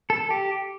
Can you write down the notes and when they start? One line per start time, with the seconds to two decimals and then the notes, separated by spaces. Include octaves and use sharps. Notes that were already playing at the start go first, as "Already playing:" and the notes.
0.10 A4
0.31 G4